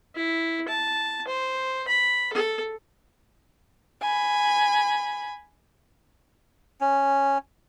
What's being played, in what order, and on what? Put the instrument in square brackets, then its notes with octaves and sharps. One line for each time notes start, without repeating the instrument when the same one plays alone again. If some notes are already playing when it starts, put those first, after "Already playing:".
[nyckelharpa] E4
A5
C5
B5
A4
[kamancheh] G#5 B5
[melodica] C#4